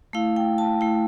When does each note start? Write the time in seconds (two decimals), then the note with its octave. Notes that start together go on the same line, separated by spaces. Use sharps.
0.13 A3 E4 F5
0.36 G5
0.58 A5
0.81 A3 E4